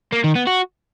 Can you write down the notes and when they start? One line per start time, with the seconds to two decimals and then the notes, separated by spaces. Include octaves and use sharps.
0.13 A#3
0.24 D#3
0.35 B3
0.47 F#4